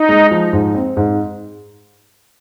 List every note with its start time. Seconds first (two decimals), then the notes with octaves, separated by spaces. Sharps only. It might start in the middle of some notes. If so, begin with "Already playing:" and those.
Already playing: D#4
0.09 G#3
0.31 F3
0.53 G#2
0.75 C4
0.97 G#2